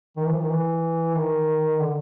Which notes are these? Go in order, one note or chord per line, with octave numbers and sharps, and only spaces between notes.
D#3
E3
F3
D#3
E3
D#3
D3